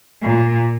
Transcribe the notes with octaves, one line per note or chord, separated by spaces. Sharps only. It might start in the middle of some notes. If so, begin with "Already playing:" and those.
A#2